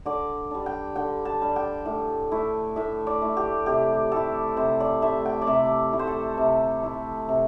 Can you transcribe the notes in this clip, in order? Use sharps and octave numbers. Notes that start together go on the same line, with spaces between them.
D3 D5
G3 D4
G5
D3 G5
A5
G3 D4
G5
A2
A3 E4
A2 E5
D5
A3 E4
G4
C3 G4
A3 E4 A4
C3 C5
D5
A3 E4 E5
G5
D5
C3 E5
A3 E4
C5
A4
C3
A3 E4
C3